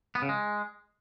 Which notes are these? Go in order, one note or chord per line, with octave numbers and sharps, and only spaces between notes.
B3
C#3
G#3